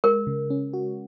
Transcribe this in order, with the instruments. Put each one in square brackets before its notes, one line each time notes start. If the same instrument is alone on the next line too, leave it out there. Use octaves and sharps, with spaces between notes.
[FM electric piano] G#3 [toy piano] A#4
[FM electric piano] C#3
C#4
F#4